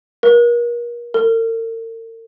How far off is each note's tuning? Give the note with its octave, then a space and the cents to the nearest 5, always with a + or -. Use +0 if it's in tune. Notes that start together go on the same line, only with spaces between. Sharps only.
A#4 +35
A#4 -45